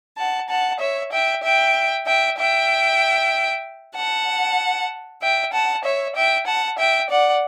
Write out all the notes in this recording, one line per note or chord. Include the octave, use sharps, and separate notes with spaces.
F#5 A5
F#5 A5
C#5 E5
E5 G5
E5 G5
E5 G5
E5 G5
F#5 A5
E5 G5
F#5 A5
C#5 E5
E5 G5
F#5 A5
E5 G5
D5 F#5